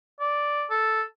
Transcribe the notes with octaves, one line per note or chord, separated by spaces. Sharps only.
D5
A4